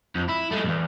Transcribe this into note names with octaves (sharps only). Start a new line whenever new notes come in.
F2
E4
G#3 A3
B1 E2